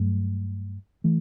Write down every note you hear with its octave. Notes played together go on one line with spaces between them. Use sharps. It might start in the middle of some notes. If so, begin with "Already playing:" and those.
Already playing: G2 F#3 A3
E3 A3